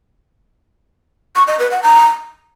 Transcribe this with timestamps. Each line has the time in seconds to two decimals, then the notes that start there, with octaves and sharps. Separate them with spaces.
1.36 C#6
1.48 D#5
1.59 B4
1.71 F#5
1.83 A#5